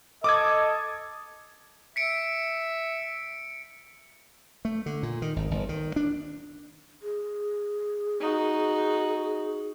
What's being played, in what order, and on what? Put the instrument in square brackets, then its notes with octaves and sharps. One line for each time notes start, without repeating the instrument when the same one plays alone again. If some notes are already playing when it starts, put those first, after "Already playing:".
[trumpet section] A4 D#5 [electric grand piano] D6 D#6 G#6
[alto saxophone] E5 [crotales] B6 C#7 D7
[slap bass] A3
D3
A#2
D#3
G#1
G1
D#3
D4
[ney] G#4
[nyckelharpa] D#4 F#4